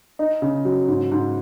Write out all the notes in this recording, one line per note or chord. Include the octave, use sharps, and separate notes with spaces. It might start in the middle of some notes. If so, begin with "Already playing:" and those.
D#4
C#3
F#3
G#2
G#2